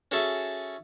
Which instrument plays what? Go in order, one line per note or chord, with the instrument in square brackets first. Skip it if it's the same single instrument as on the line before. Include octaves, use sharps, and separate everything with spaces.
[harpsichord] C#4 F#4 G#4 A4 E5 A5